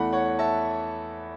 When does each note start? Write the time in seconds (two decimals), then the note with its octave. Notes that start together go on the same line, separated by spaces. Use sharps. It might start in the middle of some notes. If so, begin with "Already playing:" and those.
Already playing: E2 E3 A3 F#5 B5
0.12 C#5 F#5
0.39 E5 A5